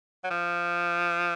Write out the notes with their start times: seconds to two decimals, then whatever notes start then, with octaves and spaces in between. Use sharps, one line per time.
0.24 F#3
0.31 F3